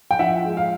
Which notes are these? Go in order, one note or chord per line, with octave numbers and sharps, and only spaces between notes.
G5
F3 E5 F#5
G#3
F5